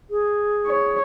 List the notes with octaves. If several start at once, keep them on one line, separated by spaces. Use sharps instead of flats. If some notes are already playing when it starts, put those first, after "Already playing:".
G#4
C#5